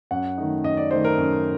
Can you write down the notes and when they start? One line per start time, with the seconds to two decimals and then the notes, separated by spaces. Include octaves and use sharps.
0.11 F#2 F#5
0.38 D#3 A3 D#4
0.64 F#2 D#5
0.77 D5
0.91 D#3 A3 D#4 C5
1.04 A#4
1.18 F#2